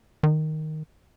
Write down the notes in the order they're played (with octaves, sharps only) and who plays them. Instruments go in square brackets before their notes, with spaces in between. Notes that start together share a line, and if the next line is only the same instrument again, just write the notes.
[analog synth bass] D#3